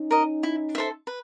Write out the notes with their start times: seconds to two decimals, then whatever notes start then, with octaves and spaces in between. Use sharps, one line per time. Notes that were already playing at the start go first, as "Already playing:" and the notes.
Already playing: C#4 D#4
0.11 A#4 D#5
0.43 E4
0.75 A4 C5 E5
1.07 B4